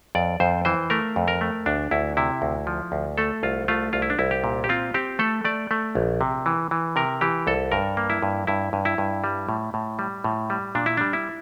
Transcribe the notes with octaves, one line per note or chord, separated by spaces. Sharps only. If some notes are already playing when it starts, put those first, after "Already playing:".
F2 D5
F2 C5
E3 C5
A3 A#4
F2
A#4
A3
D2 D4
D2 E4
C3 E4
D2
F3
D2
A3 A4
C2 F4
A3 F4
C2 F4
E4
D4
C2 E4
G4
A#2
G4
C4 F4
C4 G4
A3 A4
A3 D5
A3
A#1
C3
E3
E3
C3 A#4
E3 G4
C2 A4
G2 A#4
A#3
E4
G2
G2 E4
G2
E4
G2
G3
A2
A2
G3
A2
G3
A#2 D4
E4
G3 D4
E4